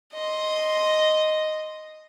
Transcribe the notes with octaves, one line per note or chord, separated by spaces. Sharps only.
D#5 C6